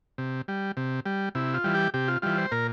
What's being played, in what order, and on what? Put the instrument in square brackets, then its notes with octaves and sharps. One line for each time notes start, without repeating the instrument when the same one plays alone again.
[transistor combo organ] C3
G3
C3
G3
C3 E4
F4
E3 G3
G4
C3 G4
F4
E3 G3 F4
C5
A#2 A#4